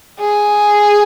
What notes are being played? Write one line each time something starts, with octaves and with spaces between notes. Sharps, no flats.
G#4